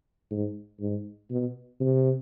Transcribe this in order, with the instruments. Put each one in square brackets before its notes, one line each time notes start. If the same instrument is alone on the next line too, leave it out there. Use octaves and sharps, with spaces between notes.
[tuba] G#2
G#2
B2
C3